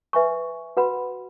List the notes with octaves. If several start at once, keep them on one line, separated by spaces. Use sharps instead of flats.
B4 E5 G#5 C#6
F#4 B4 F#5 B5